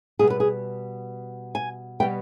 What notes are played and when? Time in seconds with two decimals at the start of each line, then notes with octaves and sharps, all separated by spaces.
0.19 B2 G3 B3 G#4
0.30 B4
0.40 G#4
1.55 G#5
2.00 B2 G3 B3 G5